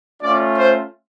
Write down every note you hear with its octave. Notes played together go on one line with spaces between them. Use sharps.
A3 C#4 F4 D5
C5